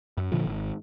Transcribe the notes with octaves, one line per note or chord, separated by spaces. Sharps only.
F#2
A#2 D3 F3
G#1